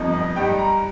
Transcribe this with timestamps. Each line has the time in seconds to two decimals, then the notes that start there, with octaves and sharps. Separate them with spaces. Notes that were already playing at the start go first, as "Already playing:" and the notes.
Already playing: G1 F2 F3 D#4
0.14 D#5
0.36 G2 G3 D#4 G5
0.58 A#5